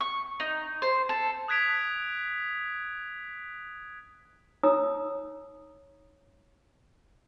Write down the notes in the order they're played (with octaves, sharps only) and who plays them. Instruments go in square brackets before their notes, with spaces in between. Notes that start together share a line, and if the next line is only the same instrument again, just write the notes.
[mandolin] C#6
D#4
C5
A4
[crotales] D#6 F#6 G#6 B6 D7 F7
[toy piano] D#4 C#5 A#5 D#6 E6